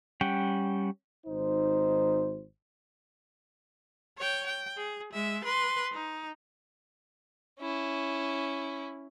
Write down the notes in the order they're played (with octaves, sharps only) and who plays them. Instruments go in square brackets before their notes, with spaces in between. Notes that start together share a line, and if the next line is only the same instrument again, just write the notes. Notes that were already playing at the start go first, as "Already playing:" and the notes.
[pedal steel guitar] G3 C#4 F#5 G5
[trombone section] G#1 D#4 C5
[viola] C#5 G5
G5
G#4
G#3 E5
B4 C6
D#4
[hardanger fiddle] C#4 E4